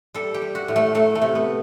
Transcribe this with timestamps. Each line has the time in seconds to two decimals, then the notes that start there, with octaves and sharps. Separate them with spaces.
0.14 G3 A4
0.34 G4
0.42 G3
0.55 F#4
0.68 A2
0.76 A3
0.95 F#3 A3
1.15 A3
1.22 C3
1.35 B3